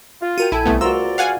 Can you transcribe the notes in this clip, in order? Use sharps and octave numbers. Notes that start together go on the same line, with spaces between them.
F4
F#4 A#4 G5 D#7
A#1 E4 A4 G5 G#5
C2 A3 B3
C#2 F4 F#4 A#4 C5 D5 A#5 E6
F5 F#5 G#5